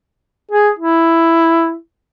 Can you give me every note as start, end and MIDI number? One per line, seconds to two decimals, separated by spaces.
0.52 0.69 68
0.79 1.74 64